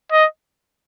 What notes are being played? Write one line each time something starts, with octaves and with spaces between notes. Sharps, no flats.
D#5